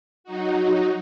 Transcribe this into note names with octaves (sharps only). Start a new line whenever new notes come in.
F#3 D#4 F#4